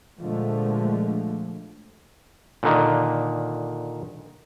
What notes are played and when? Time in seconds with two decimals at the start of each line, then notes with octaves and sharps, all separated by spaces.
0.21 A#2 D3 F3 G#3 A3
2.63 A#2 D3 D#3